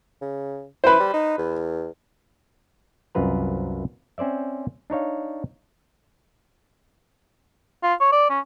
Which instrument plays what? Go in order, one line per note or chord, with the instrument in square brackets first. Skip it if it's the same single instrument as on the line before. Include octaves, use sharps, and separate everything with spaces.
[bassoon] C#3
[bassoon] E4 [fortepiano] B4 C5
[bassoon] G3
D#4
E2
[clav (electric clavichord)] C2 F#2 F4 B4 A#5
C4 C#4 C5 D5 E5
D4 D#4 C#5 F5
[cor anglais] F4
C#5
D5
C#4